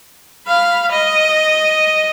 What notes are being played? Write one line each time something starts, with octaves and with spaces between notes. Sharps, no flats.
F5 B5
D#5